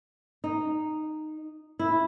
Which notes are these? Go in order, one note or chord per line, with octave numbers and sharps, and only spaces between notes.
D#4
E4